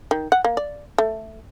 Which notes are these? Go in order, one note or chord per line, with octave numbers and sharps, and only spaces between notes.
D#3
F#5
A#3
D5
A3